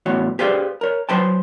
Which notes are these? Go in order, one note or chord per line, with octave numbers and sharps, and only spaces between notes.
E2 A2 F#4 C#5
G4 G#4 B4 C5 D5 F5
A#4 C#5
F#3 B4 C5 G5 A5